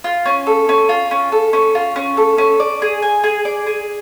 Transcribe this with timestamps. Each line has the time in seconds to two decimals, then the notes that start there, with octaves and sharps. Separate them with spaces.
0.04 F4
0.26 C#4
0.47 A4
0.69 C#4
0.89 F4
1.11 C#4
1.32 A4
1.53 C#4
1.75 F4
1.96 C#4
2.17 A4
2.38 C#4
2.60 D5
2.82 G#4
3.02 G#5
3.24 G#4
3.45 D5
3.67 G#4